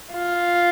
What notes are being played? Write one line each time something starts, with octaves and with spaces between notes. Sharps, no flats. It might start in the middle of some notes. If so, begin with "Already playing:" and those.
F4